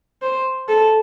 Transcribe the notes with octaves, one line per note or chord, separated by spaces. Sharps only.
C5
A4